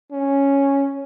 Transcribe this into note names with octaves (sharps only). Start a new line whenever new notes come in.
C#4